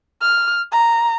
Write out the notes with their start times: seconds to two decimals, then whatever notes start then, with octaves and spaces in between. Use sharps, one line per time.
0.22 F6
0.72 A#5